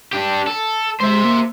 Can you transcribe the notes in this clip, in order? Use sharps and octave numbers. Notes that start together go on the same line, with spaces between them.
D4 G4
A4
G#3 C5 E5
A#3